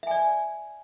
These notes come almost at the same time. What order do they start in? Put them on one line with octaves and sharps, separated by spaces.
E5 G#5 D5